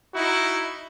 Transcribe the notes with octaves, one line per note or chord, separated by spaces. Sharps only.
D#4 E4 F#4